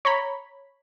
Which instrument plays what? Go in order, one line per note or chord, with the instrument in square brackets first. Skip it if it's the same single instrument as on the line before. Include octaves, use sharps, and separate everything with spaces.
[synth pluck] C#5 A#5 B5